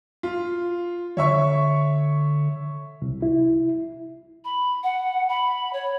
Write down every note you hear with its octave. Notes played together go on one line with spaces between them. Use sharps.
F4
D3 C#5 E5 C#6
C2
E4
B5
F#5
B5
C#5